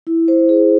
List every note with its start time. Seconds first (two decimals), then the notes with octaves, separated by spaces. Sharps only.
0.07 E4
0.28 C5
0.49 G#4